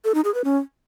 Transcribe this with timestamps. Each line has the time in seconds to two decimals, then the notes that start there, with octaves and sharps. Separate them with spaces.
0.05 A4
0.15 D#4
0.24 G#4
0.34 B4
0.44 C#4